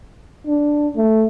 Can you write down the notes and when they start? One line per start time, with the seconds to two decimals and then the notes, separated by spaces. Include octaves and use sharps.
0.47 D4
0.96 A3